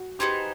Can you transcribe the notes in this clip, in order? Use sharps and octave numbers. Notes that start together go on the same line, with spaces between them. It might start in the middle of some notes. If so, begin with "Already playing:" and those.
Already playing: F#4
B3 D#4 G4 G#4 C5